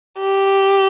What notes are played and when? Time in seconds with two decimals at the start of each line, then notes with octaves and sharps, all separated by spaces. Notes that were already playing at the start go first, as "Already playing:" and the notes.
0.20 G4